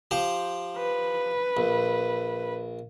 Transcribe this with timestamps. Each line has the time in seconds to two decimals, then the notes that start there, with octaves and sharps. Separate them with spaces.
0.11 F3 G4 C5
0.77 B4
1.57 A#1